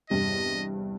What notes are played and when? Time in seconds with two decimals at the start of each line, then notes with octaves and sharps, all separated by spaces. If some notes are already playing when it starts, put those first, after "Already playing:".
0.10 E2 G2 C3 D#5